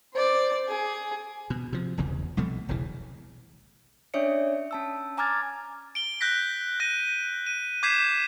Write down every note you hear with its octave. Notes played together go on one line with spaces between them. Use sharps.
C5 D5
G#4
B2
C3 F3
F1 B1 E2 C#3
C2 B2 F3 A3
E1 B1 C#3 E3
C#4 D4 C#5 D5 E5 C#7
C#4 A5 E6
G#5 A#5 D6 F6 G#6 A6
D7 G7
F#6 G6 A#6 B6
F#6 A#6 D#7
D#7
D6 G6 G#6 B6 C7 E7